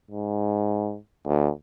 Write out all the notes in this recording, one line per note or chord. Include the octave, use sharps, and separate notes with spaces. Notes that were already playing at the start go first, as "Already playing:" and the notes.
G#2
D2